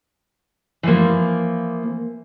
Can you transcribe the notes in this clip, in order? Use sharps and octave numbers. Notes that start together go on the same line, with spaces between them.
E3 F3 A#3